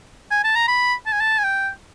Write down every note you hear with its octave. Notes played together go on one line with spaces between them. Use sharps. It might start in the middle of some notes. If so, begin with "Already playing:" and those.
G#5
A5
A#5
B5
A5
G#5
A5
G#5
G5